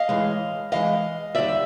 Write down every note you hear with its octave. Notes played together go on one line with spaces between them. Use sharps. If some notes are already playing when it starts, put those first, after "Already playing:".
Already playing: D#5 F5
A2 E3 G#3
A2 E3 G#3 D#5 F5
D#2 D3 G3 D5 E5